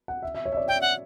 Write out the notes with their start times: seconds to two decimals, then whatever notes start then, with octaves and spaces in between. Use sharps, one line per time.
0.08 F#5
0.22 E5
0.35 E5
0.46 C#5
0.53 E5
0.57 D5
0.68 E5 G5
0.81 F#5